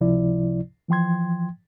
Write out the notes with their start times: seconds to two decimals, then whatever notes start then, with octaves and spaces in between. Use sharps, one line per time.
0.01 C#2 C3 F3 E4 D5
0.88 E3 F3 G5 C6 G#6